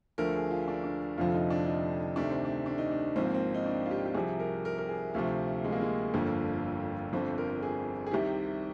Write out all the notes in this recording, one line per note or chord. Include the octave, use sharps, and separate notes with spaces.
D2 D3 F3 A#4
G#4
F4
D4
D4
F1 F2 D3 F3 F4
D#4
D4
D#4
D2 C3 D#3 D4
C4
D4
D4
D#4
D4
G#1 G#2 F3 C4
A#3
C4
D#4
D4
F4
G4
G4
C2 C3 F3 G#4
A#4
A#4
A#4
G#4
D2 C3 F3 F4
G#3
A#3
G#3
G1 F2 D3 F3 A#3
G1 F2 D3 F3 C4
A#4
G#4
G#4
C2 C3 D#3 G4